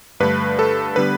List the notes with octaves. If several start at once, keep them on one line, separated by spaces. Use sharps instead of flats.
G2 D3 A3 B4
A4
D3 G3 B3 B4